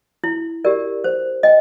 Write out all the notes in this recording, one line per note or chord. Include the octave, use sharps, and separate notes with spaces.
E4
G4 A#4 D5
C5
D#5 G5